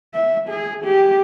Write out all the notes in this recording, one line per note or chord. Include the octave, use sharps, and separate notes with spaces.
E5
G#4
G4